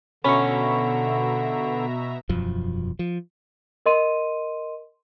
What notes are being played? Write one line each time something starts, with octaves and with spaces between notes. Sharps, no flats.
B2 D3 C#4 E5 A#5 B5 C#6
E1 F#2 F3
F3
A#4 D#5 C6 D#7